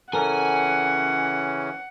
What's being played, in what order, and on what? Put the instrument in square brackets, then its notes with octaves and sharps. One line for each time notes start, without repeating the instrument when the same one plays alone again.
[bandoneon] C#3 E3 C#4 [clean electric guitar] A4 A#4 [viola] F#5 [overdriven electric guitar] G#5